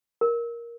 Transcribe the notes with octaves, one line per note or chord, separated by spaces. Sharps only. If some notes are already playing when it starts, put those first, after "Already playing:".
A#4